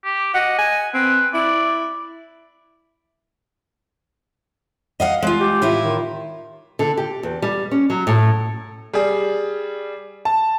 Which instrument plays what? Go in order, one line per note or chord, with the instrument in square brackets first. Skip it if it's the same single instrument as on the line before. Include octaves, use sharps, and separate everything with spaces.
[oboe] G4
[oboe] D#5 [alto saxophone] F#5
[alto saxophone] G#5
[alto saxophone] C4 [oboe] B4
[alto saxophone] E4 [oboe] D5
[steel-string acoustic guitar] D#5 F5 F#5
G#3 F4
[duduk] G4
[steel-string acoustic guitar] A2 E4 F4
[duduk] D#3
[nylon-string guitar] D3
G4
E2
G3
C#4
F#3
A2
[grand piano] G3 G#4
A5